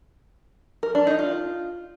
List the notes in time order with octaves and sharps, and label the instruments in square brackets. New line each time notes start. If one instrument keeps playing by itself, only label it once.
[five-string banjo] A#4
D4
D#4
F4